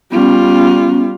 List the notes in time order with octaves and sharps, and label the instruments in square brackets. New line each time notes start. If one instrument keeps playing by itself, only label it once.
[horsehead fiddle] G3 F4 [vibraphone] B3 C#4